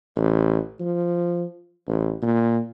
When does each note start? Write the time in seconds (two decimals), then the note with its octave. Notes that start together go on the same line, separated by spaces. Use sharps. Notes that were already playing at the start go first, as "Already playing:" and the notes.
0.16 A1
0.80 F3
1.88 A1
2.22 A#2